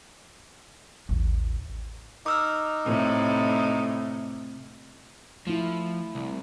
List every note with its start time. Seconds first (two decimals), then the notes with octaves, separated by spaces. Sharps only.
1.09 A1 D#2
2.26 D#4 D6 E6 F6
2.86 A2 C3
5.47 F3 A3 E4
6.15 C2